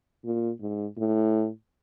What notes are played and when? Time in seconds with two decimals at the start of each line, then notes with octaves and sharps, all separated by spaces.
0.25 A#2
0.61 G#2
0.97 A2